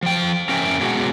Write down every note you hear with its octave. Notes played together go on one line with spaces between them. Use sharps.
F3 G5
C#4 A#4 E5 G5
B2 F#3 G#3 F#4